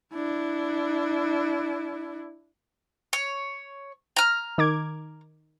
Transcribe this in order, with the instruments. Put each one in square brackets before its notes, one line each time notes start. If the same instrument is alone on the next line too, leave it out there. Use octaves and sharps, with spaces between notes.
[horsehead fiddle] D4 E4
[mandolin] C#5
A#5 F6
[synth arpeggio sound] D#3 D6 G#6